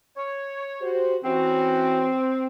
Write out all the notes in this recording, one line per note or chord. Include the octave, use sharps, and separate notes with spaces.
C#5
F#4 G4 C5
E3 C4 C#4 F#4